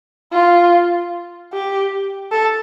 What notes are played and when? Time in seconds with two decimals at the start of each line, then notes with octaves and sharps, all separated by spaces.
0.32 F4
1.53 G4
2.32 A4